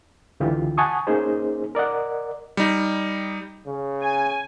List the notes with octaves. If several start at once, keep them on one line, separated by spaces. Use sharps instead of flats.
C#2 D3 E3 F4 G4
F#5 G#5 A5 C#6 D#6
A#3 C#4 D#4 G#4 C5
A#4 D5 D#5 F#5
G3 D#4
C#3
G#5